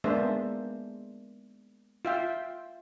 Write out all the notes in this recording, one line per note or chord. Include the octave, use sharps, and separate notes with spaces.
G#3 A#3 B3 D4 C5 E5
F4 E5 G5